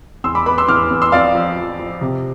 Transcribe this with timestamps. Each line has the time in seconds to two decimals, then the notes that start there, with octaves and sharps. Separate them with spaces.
0.24 E2 C6 E6
0.35 B5 D6
0.46 B3 B5 D6
0.58 C6 E6
0.68 E2 D6 F6
0.91 E2
1.02 C6 E6
1.12 F2 D5 F5
1.35 F3
1.57 F3
1.80 F3
2.01 C3